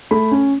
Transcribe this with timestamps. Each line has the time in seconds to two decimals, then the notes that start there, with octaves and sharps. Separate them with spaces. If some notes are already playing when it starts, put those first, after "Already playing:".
0.11 A3 B5
0.32 C#4